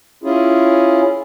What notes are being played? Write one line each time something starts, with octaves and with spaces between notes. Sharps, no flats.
C#4 E4 F4 G#4